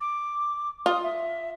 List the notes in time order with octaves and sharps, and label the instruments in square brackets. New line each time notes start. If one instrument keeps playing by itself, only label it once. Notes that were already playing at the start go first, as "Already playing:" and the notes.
[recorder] D6
[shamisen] F4 [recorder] D#6
[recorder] E5